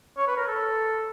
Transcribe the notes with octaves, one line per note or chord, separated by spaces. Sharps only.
C#5
B4
A#4
A4